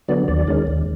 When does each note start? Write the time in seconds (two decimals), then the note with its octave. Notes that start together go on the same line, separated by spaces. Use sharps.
0.08 D3 F#3 B3 D5
0.28 D#2 D5
0.47 D#3 G#3 C#4
0.67 D#2